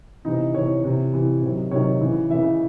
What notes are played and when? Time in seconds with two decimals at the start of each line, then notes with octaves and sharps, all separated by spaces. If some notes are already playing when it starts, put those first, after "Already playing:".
0.25 C3 E3 D#4
0.54 C3 E3 C#5
0.84 C3 E3
1.13 C3 E3
1.42 C3 D#3 F#3
1.71 C3 D#3 F#3 C#5
2.01 C#3 E3
2.30 C#3 E3 E5